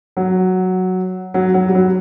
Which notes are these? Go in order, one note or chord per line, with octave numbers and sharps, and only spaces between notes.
F#3
F#3
F#3
G3
F#3